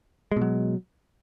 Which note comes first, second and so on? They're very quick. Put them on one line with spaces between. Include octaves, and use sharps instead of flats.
G#3 B2 F#3